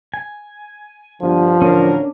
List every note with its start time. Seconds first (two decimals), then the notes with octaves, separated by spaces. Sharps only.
0.14 G#5
1.21 G1 D3 F3
1.62 A1 D3 C#4 D4 A#4